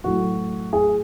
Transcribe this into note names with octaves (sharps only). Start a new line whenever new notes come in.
A2 F#3 A3 F#4
G#4